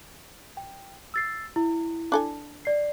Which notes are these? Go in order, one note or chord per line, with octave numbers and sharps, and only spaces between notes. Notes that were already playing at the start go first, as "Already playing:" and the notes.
G5
E6 A6 C7
E4
D4 A4 G#5
D5 C7